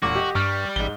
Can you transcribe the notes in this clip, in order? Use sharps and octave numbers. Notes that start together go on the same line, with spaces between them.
E1 A#2 F#4 D6
G4 D#5
G2 G3 C#6 F6
A1 G#2 G7